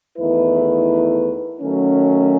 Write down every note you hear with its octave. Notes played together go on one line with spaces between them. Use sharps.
E2 D#3 A3 E4 B4
D#3 F#3 A3 C#4